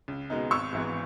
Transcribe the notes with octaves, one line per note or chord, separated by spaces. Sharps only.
C#2
B2 G#3 B3 D#4
G#1 C#6 E6
G#2 E3 B3